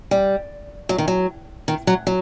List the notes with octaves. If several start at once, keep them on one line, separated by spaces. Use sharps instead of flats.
G3
F#3
D#3
F#3
D#3
F#3
F#3